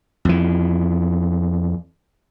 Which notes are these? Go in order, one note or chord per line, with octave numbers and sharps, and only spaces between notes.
F2 E3